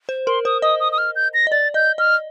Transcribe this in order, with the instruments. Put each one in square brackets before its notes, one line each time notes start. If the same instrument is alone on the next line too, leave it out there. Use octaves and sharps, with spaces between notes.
[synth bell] C5
[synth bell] A#4 [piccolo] C6
[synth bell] C5 [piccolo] D#6
[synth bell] D#5 [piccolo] D#6
[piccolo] D#6
D#6
F6
G6
A#6
[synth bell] D#5
[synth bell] D5 [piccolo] A6
[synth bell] D#5 [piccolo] G6
[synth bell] D#5 [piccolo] F6